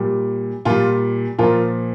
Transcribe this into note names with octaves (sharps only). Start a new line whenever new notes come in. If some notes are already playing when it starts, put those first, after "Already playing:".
Already playing: A#2 G3
A#2 G3 F4
A#2 F3 F4 A#4